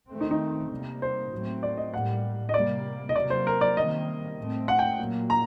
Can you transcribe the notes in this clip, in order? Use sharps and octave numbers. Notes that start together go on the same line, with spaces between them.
D#3 A3 C4
D#4
D#4
C3 G3 A#3
C5
A2 F#3 A3 C4
D5
D#5
A2 G3 A#3 F#5
D#5
C3 G3 A#3 D5
D#5
C3 F#3 A#3 D5
C5
A#4
D5
C3 D#3 G3 A#3 D#5
A2 A3 C4
F#5
G5
A#2 F#3 A#3
A#5